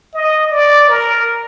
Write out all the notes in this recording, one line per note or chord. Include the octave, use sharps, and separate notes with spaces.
D#5
D5
A#4